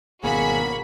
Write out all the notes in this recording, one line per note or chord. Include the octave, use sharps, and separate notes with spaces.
G#1 B2 A#3 F#4 G#4 B5